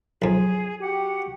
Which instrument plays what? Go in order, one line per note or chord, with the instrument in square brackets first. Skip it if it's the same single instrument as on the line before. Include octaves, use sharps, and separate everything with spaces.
[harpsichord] B1 F2 [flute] G#4
[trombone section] F#4 G4 [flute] F#5